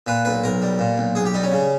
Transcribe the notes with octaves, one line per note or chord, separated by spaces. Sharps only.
A#2 B4
B1 B4
B1 A#4
G3
A#2
B1
B1 G#4
G4
G3 D#4
C#4
C#3